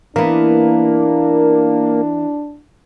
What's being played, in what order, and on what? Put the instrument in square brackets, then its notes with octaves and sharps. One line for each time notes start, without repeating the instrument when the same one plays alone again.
[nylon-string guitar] E3 B3 [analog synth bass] A#3 [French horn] D4